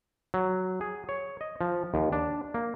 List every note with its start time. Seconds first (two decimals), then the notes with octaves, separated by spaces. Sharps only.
0.34 F#3
0.81 G#4
1.09 C#5
1.41 D#5
1.61 F3
1.94 D#2
2.12 D4
2.54 A#3